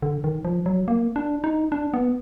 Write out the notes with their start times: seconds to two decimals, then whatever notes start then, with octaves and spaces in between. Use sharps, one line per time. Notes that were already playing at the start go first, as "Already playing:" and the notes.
0.02 D3
0.24 D#3
0.45 F3
0.66 F#3
0.88 A#3
1.16 D4
1.44 D#4
1.72 D4
1.94 B3